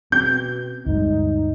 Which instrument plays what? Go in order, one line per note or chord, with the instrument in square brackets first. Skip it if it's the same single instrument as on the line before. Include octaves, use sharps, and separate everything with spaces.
[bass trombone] B2 [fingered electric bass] C4 C#4 [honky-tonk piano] G6
[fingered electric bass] D2 G2 G#3 [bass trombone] D#4